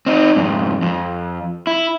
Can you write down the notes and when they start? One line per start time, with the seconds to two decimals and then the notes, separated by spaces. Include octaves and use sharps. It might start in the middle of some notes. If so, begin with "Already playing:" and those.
0.06 C4 D#4
0.36 F2 G#2
0.82 F2
1.67 E4